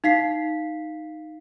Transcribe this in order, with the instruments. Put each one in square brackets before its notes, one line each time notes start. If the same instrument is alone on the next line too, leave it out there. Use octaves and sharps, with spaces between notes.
[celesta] D#4 F5 B6 C7